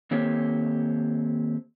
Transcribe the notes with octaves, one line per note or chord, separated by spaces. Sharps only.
D#3 A#3 C4 G4 A4 C#5